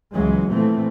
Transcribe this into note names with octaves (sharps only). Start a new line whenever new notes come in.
C#2 C#3 E3 F#3 G#3
A#2 E3 F3 A3 C4